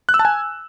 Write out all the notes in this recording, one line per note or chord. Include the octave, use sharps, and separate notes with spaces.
F#6
E6
A5
G#5